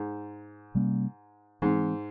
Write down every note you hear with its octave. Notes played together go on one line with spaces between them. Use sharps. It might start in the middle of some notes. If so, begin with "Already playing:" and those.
Already playing: G#2
C3 G3 A#3 C#4
G#2 E3 G#3 C4